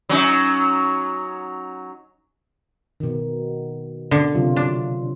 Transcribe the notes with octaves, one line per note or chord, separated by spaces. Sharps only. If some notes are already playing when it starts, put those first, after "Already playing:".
F#3 C#4 D#4
B2 D#3
B2 D3
C3 F#3 F4
D4